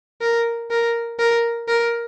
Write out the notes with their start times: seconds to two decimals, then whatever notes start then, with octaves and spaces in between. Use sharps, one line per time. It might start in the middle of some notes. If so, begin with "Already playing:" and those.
0.21 A#4
0.71 A#4
1.19 A#4
1.68 A#4